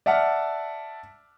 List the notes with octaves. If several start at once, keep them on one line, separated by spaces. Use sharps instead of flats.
D5 E5 F#5 A5 F6